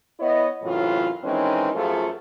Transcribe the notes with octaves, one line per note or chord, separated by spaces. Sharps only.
B3 E4 C#5 D#5
F#2 A2 C3 E3 F#3 F4
D#3 E3 G#3 C4 C#4 D#4
F#2 F3 A3 F4 G#4 A4